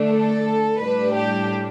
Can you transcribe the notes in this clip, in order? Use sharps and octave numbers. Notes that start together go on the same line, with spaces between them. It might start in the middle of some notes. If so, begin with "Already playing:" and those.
Already playing: D3 A3 D4
A4
A2 G3 D4 B4
G4